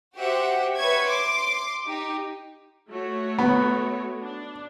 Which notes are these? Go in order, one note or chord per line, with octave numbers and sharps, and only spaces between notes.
F#4 G4 C5 E5 F#5
B4 C#5 E5 C#6 G#6
C6 D6
D#4 G4
A3 F#4 C#5
B3
D4